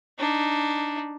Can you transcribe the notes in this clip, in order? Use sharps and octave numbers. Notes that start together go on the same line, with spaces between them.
D4 D#4